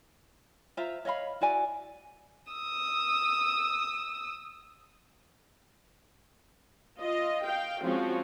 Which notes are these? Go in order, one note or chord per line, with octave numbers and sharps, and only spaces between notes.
F4 C5 E5 A#5
C#5 D#5 F5 B5
E4 F#4 D5 G#5
D#6 E6
F4 D#5
F5 G5
F3 G#3 C4 C#4 F4 F#4